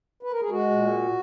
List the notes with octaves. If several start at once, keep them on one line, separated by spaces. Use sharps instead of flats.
B4
A#4
G#4
G#3 F#4
A#2